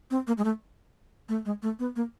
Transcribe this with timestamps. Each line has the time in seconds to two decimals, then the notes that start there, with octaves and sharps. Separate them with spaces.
0.11 C4
0.27 A#3
0.38 G#3
0.44 A3
1.29 A3
1.45 G#3
1.62 A3
1.79 B3
1.96 A#3